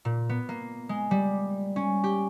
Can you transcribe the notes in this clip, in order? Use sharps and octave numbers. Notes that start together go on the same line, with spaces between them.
A#2
B3
A#3
G#3
G3
C#4
G4